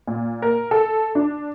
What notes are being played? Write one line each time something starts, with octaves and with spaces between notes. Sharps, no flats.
A#2
A#4
A4
D4